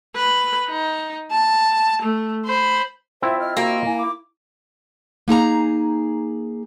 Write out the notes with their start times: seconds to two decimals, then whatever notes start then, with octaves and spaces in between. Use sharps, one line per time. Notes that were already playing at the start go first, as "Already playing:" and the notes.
0.16 B4
0.68 D#4
1.32 A5
2.02 A3
2.46 C5 B5
3.22 C4 E4 F4 C5 E5
3.40 D#5 F6
3.57 A#3 F#4
3.86 E4 G#5
3.98 D6
5.28 A#3 D#4 G#4 A#5